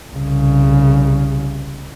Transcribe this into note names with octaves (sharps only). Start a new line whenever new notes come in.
C2 C#3